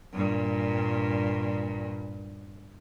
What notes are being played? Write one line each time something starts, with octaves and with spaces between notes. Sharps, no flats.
G2 A#2